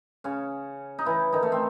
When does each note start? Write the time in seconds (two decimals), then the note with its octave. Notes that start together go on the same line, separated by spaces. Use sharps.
0.24 C#3 C#4
0.99 D#4
1.05 E3 E4
1.33 D#3 D#4
1.43 A3
1.52 C4